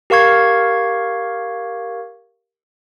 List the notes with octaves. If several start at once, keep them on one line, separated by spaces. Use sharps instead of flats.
G4 A#4 F5 C#6 G#6